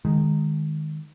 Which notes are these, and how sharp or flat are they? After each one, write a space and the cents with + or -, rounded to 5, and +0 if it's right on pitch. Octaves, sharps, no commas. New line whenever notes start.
D#3 -15 G#3 +0